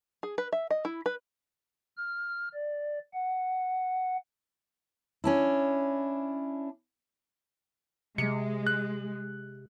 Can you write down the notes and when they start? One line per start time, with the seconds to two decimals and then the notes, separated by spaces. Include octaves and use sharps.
0.23 G#4
0.38 B4
0.53 E5
0.71 D#5
0.85 E4
1.06 B4
1.97 F6
2.54 D5
3.13 F#5
5.24 C#4 D4 E4
8.18 C3 G#3 C#7
8.67 F#6